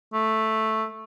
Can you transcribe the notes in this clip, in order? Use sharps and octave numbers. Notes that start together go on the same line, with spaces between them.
A3